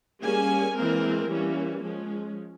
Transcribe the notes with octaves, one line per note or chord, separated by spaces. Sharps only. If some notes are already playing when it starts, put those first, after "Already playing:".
G3 A#3 C#4 G#4 G#5
E3 G#3 A#3 C4 A#4
E3 G3 A#3 C#4
F3 G#3 C#4